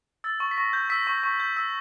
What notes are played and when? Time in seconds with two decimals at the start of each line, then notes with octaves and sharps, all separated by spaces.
0.24 E6 A6
0.40 C#6
0.51 B6
0.57 C#6 A#6
0.73 G6
0.90 E6 B6
1.07 C#6
1.23 C#6
1.40 G6
1.57 E6